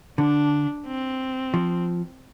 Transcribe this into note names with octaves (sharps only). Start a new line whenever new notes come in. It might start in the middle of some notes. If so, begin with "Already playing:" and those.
D3 D4
C4
F3